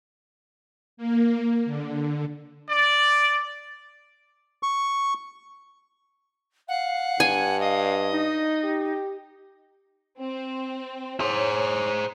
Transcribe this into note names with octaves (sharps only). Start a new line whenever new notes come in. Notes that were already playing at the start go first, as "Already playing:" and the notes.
A#3
D3
D5
C#6
F5 F#5
G2 G#5
D#5 F5
D#4
G4
C4
G#4 C5 C#5